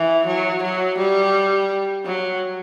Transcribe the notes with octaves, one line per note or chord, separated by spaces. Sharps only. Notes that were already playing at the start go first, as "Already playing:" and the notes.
Already playing: E3
F#3
F#3
G3
F#3